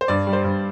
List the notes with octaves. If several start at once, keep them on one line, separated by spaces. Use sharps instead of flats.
C5
G2 D5
G3
C5
G2